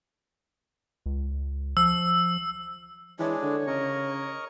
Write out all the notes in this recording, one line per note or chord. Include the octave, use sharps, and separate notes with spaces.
C#2
F3 E6
E3 G#3 D4 C#5
D3
C#3 A#4 D#5 C#6